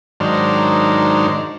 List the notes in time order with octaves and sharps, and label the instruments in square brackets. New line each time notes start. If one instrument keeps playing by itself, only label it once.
[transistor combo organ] G#2 D#3 F#3 D4 A#4 C5